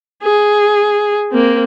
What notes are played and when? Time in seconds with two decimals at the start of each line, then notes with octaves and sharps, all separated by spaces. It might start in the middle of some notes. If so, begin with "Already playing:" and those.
0.24 G#4
1.32 A#3 C4